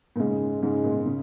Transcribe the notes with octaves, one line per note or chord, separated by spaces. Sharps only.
A#2
G#2 C#3 G#3
G#2 C#3 G#3
A#2
A#2
C#3